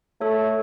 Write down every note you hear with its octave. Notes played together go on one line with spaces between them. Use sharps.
A3 A4 C#5